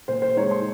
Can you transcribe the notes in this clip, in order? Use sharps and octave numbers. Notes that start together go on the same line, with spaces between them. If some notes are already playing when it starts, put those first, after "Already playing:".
A#2 C5
C5
G#3 D#4 C#5
C6